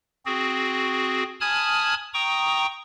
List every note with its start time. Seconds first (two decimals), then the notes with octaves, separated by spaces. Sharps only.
0.26 C4 F#4 G#4
1.41 G#5 A5 B5 D#6 F6 G#6
2.14 G5 A#5 C#6 D#6